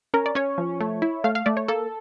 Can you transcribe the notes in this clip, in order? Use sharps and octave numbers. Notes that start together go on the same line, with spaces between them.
C#4 A#4
D5
C#4 C#5
F3
A3
E4
A3 F5
F5
A3 D5
C#5
A#3 A4